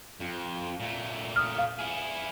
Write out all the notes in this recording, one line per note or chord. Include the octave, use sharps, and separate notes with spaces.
F2
A#2 A3
D#6 F6
F5
E4 G#4